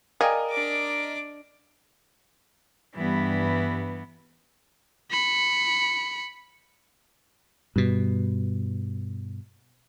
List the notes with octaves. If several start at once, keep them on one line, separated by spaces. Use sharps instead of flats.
G#4 A#4 D5 D#5 F5 G5
D4 D6
G2 E3 B3
B5 C#7
G2 B2